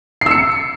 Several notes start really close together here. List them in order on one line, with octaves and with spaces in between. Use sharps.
C7 E6 C#7